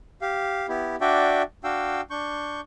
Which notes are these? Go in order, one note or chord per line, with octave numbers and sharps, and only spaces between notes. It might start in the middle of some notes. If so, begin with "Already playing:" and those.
G4 F5
B3 E4 G4
D4 F#4 D5 E5 G5
D4 F#4 F5 G5 E6
D4 C#6 G6